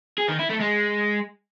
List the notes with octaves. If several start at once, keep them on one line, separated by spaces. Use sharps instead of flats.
G#4
D#3
E4
A3
G#3